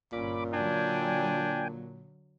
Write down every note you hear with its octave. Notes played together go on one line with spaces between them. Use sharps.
G1 A#2 C#4 B5 D6
D3 F#3 D4 G5 G#5